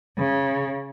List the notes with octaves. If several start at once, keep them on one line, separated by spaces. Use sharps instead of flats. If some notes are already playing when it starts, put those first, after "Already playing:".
C#3